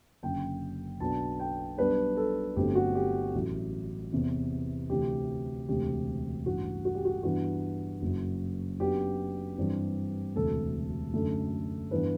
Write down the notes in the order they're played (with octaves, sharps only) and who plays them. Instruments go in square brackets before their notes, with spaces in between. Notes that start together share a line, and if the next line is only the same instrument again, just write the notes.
[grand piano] F#1 F#2 D3 G5
B1 B2 F#3 B3 D4 A5
G5
B1 B2 G3 D4 B4
A4
G1 G2 F#3 A3 C4 G4
F#4
G4
A1 A2 F#3
E2 C3 E3
D2 C3 E3 G4
E1 D2 C3 G4
A1 G2 E3 F#4
F#4
G4
F#4
G2 E3 B3 D4 F#4
F#1 F#2 F#3
F#2 F#3 B3 D4 G4
G2 E3 G3 C4
E1 D2 C3 A4
F#2 D3 A3
G2 E3 B3 D4 B4